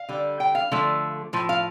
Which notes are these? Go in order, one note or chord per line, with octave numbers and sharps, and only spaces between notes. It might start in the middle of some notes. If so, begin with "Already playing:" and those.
Already playing: F5
D3 G3
G5
F5
D3 F3 A3
A2 F3
F5